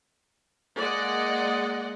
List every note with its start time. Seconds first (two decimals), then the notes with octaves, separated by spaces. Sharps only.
0.78 G#3 A#3 D5 D#5 F#5